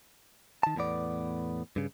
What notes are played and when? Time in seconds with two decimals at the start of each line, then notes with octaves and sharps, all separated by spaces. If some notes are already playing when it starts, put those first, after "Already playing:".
0.63 D#3 A5
0.76 E2 A2 B3 D5
1.76 G2 C#3